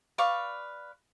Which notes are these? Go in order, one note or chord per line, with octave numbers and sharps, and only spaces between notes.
B4 D5 F5 C#6